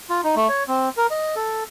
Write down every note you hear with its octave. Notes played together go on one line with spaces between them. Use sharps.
F4
D#4
A3
C#5
C4
A#4
D#5
A4